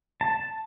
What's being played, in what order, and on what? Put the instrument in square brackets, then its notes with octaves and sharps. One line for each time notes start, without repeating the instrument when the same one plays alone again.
[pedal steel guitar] A5